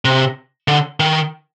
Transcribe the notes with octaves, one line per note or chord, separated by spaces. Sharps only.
C3
D3
D#3